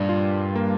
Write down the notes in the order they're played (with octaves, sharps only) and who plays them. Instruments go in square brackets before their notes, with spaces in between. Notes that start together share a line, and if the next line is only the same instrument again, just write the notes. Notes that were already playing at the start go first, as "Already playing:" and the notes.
Already playing: [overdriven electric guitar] G2 [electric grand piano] A#2
[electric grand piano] F4
A#3